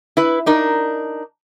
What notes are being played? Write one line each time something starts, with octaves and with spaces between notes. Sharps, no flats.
E4 B4
D4 D#4 A#4